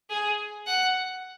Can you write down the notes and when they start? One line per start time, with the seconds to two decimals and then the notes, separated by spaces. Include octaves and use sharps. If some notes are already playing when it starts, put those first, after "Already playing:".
0.10 G#4
0.67 F#5